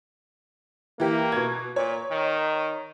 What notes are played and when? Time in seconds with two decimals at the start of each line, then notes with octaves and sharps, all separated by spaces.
1.00 E3 A#3 G4
1.32 B2 G#6
1.76 A#2 C#5
2.11 D#3